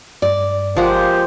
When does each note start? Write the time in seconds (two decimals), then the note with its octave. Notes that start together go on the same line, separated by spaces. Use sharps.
0.22 G2 D5
0.77 G1 F3 G#3 A#3 G4 F#5